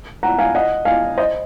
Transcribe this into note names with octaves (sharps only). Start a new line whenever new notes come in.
F#5 A#5
F5 G#5
D#5 F#5
F5 G#5
C5 D#5